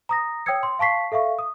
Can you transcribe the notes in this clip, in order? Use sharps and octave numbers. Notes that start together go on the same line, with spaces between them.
A#5 D#6 A#6
C#5 G5 D#6 E6 G#6 C#7
C6
F5 A5 C#6 B6 C7
A4 E5 F5 C#6
D#6